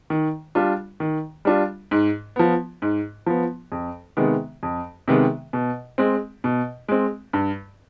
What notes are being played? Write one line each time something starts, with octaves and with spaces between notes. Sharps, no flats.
D#3
G3 D4 F4
D#3
G3 D4 F4
G#2
F3 B3
G#2
F3 B3
F2
C3 D#3 G#3 B3
F2
C3 D#3 G#3 B3
B2
G#3 C4
B2
G#3 C4
G2